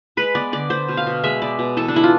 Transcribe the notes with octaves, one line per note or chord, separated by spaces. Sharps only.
G#3 B4
B3 D5
D3 D5
B3 C5
B2
F5
B2
G#3 E5
B3 D5
B2
E3 A4
D4
G#3 E4
F4